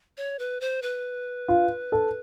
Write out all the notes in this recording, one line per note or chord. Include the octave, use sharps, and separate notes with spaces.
C#5
B4
C5
B4
F4
A4